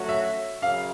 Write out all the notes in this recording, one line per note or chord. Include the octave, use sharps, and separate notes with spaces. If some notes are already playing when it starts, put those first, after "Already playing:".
Already playing: F#3 A3 C#4 F#4
E5
F#2 C#3 F5